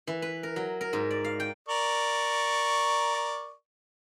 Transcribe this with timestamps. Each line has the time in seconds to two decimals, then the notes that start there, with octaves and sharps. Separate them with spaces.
0.07 E3
0.22 B4
0.43 A#4
0.56 F#3
0.81 A#4
0.93 G#2
1.11 D5
1.24 F5
1.40 G5
1.69 A#4 D5 C#6